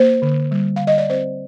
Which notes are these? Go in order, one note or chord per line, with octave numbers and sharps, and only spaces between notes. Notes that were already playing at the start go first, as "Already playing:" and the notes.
Already playing: A#3 C5
D3
G3
D3 F5
D#5
D5
C4 C5